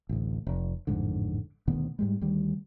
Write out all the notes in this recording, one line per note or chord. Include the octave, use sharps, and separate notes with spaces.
A1 D2
F1
A1 F2 G#2 D3
D2 B2 D#3 B3
G#2 G3 G#3
D2 D#3 G3